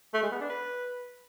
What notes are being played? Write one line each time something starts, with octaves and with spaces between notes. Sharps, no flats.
A3
G#3
B3
D4
B4